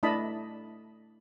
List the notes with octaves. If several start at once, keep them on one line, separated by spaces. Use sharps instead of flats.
A3 D4 E4 D#5 A5 B5